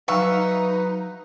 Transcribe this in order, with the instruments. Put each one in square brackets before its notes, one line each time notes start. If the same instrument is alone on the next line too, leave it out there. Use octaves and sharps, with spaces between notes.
[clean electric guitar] F#3 F5 [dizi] D#4 [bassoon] B4 [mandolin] E5 C#6